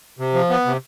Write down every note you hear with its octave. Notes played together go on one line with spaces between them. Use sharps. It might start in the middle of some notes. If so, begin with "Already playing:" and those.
C3
F3
B3
C3